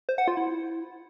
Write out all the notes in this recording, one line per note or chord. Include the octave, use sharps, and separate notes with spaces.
C5
F#5
F4
E4